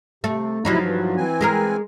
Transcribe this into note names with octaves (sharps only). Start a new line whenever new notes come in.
C3 A3
D2 C3 F3 F#3 D#4 E4
G2 E3
E3 C4 G#5
G#3 G#4 A#4